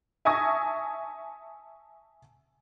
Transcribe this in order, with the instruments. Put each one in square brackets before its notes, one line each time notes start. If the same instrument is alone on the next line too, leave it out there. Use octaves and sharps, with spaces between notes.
[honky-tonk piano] E5 G#5 A5 C#6 D#6 A#6